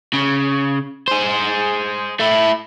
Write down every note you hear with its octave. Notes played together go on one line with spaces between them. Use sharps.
C#3
G#4 C5
A3 E4